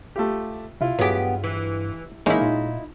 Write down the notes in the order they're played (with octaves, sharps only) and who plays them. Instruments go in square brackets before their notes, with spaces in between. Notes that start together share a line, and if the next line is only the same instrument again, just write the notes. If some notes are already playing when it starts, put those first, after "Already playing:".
[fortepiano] A3 F4 G4
[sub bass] C3 [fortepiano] E4 F4
[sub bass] G2 [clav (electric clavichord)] F#3 G#4 [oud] B3 G4
[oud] E3
[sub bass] E3 [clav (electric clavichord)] G#3 C#4 [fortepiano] A#3 [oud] D#4 E4
[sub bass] A#2 [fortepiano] F4